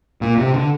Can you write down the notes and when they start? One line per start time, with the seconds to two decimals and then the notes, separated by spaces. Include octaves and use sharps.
0.21 A#2
0.38 C3
0.54 D3